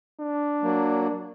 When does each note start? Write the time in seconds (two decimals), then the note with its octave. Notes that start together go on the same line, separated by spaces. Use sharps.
0.20 D4
0.63 F#3 A#3